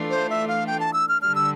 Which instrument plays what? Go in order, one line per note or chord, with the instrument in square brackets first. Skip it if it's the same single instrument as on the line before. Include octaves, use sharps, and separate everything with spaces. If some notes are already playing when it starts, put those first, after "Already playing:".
Already playing: [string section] E3 A3 D4 F4
[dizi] C5
E5
F5
G5
A5
E6
F6
[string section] D3 G3 D4 [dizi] F6
[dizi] E6